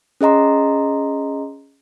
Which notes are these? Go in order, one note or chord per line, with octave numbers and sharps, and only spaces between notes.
C#4 G#4 D#5 A#5 C6